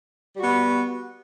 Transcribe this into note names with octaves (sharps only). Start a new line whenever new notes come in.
G3 B3 F#4